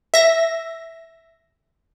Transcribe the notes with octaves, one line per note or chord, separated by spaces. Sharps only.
E5 A#6